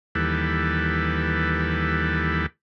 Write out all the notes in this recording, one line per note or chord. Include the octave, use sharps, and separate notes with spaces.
D#2 E3 G3 A4 B4